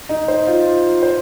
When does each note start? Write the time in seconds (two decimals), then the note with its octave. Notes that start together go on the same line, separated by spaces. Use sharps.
0.09 D#4
0.28 C5
0.47 F4
1.03 C5